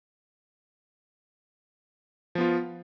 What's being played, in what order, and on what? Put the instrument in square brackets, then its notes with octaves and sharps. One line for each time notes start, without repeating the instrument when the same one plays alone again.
[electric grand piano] F3
B3
F4